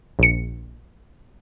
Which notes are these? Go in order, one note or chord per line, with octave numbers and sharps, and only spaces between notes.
A#1 C#7